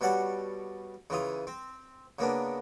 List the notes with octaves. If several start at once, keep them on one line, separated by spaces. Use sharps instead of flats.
B2 G3 C#5 F#5 A5 D6
C#3 E3 F4 D#6
C4
C#3 A#3 B3 D4